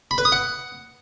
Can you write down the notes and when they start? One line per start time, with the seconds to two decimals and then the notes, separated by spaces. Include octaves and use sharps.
0.11 B5
0.18 B4
0.25 D#6
0.32 F#5